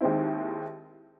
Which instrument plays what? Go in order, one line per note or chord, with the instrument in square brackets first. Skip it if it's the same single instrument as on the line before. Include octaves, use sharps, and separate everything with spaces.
[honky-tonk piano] D#2 D#3 G#3 C4 E4